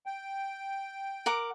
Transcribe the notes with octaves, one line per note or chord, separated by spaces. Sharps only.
G5
A#4 F#5 D6